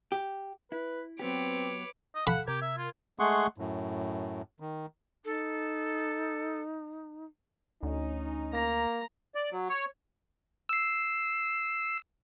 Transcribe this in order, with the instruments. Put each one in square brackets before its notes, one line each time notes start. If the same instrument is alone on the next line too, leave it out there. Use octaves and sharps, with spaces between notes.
[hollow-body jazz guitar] G4
[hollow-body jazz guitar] E4 [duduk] B4
[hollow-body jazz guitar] F#3 B3 G4 [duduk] C4 [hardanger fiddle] B4 C#5 [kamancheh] D6
[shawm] D#5
[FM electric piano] A4 F5 [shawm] F#5 [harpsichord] B5
[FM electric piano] C3 A#4 G#6 [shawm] G4
[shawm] E5
F4
[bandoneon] G#3 A3 G#4 F#5 C6 C#6
F#2 A2
D#3
[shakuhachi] D#4 [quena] A4
[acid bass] D2 [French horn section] C#4 D#4
[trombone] A#3 [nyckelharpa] A#5
[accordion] D5
F#3
C#5
[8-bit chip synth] E6 C7